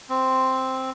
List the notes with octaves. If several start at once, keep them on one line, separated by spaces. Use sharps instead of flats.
C4